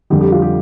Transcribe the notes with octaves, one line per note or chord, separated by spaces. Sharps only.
F2 D3 G3 G4
G4
F4
G4